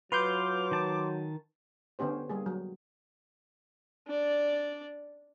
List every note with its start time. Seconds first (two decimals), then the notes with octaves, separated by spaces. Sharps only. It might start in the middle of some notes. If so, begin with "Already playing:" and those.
0.12 F#3 F4 B4 C6 D6 G6
0.71 D#3 A5
1.99 D3 B3 C#4 G4 C5
2.29 G3 A#3 G#4
2.46 F#3
4.07 D4 D5